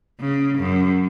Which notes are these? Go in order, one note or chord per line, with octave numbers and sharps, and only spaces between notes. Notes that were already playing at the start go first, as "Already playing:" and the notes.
C#3
F#2